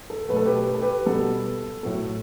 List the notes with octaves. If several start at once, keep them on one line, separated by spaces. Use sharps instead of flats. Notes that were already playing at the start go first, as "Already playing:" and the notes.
A4
B2 F#3 A3 B4
A4
G4 B4
B4
A4
G4 B4
B2 G3 B3 A4
A2 F#3 A3